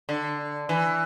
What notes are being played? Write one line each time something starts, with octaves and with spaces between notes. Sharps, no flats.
D3
E3